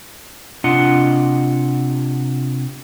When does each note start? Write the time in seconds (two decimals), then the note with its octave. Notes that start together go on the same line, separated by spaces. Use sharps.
0.64 C3 D4 F4 D#5 F#5